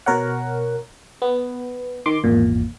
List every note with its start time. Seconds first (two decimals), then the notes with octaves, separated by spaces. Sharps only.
0.06 B2 A#4 C#5 F#5
1.22 B3
2.06 D#3 C6 D6
2.24 G#1 E2 A#2